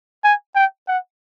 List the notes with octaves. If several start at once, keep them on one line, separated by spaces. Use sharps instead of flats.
G#5
G5
F#5